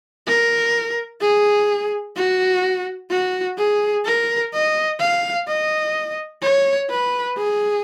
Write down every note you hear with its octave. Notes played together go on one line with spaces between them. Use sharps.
A#4
G#4
F#4
F#4
G#4
A#4
D#5
F5
D#5
C#5
B4
G#4